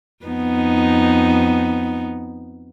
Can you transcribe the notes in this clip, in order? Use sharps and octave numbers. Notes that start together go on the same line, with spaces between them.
F2 B3 D#4